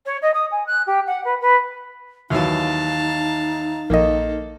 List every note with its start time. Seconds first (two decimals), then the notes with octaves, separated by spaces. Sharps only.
0.05 C#5
0.22 D#5
0.34 D#6
0.51 G#5
0.66 F#6
0.86 G4
1.06 F#5
1.24 B4
1.41 B4
2.30 D#2 E3 F#3 D#4 F5 A5
3.90 A#1 D#3 A#3 A4 D#5